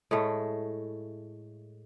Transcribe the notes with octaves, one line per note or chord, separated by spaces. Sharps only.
A2 G#3 A3